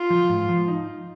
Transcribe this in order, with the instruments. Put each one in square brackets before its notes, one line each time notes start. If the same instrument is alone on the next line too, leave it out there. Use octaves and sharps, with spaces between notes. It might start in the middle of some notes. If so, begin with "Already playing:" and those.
Already playing: [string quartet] F4
[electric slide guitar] F3
G#2
F3
D#4